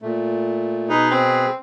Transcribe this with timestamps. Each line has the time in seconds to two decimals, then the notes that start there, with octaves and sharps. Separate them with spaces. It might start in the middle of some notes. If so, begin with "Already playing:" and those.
0.02 A#2 A3
0.90 B2 D#4 G#4 B4
1.11 C4